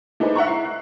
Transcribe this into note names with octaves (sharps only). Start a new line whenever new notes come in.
A3 D4 D#4 G#4 B4 C5
E5 F#5 A#5 C#6
E4 C7
F#6